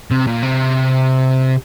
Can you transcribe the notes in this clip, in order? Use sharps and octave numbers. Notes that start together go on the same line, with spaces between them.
C3
A#2
C3